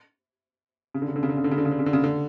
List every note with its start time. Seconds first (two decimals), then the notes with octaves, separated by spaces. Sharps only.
0.94 C#3
1.02 D3
1.08 C#3
1.16 D3
1.23 C#3
1.29 D3
1.37 C#3
1.44 D3
1.51 C#3
1.58 D3
1.65 C#3
1.71 D3
1.79 C#3
1.86 D3
1.93 C#3
2.04 D3